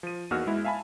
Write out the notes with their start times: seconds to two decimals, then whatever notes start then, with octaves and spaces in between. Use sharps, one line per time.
0.03 F3 D#7
0.31 E2 A#3 D#4 F#4 E6 F6
0.47 G#3 B3 E4
0.64 E5 F5 G#5 A5 B5